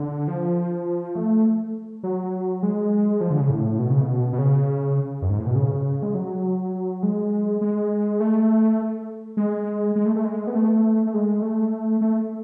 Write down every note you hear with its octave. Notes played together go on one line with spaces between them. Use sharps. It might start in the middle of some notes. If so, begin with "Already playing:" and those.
Already playing: D3
F3
A3
F#3
G#3
F3
D3
C#3
A2
B2
C#3
B2
B2
C#3
F#2
G#2
A2
B2
C#3
G#3
F#3
G#3
G#3
A3
G#3
G#3
A3
A3
G#3
B3
A3
A3
G#3
A3
A3